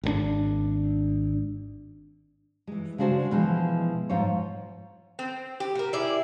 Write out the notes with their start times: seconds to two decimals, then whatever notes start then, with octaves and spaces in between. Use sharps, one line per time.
0.03 G#1 D3 D4
2.67 E3 G#3
2.98 C#3 G#3 D4 F#4 C5
3.31 B2 E3 F3 G#3
4.09 G#2 F3 F4 C#5
5.19 C4
5.60 G4
5.75 F#4 A#4
5.93 E4 G#4 D5